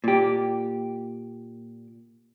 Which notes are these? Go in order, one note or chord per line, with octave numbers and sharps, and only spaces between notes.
A#2 G4